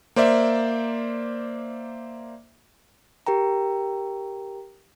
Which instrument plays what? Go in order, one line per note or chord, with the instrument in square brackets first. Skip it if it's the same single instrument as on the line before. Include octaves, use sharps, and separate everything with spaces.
[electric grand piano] A#3 C5 D5 E5
[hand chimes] G4 A#4 G5 A#5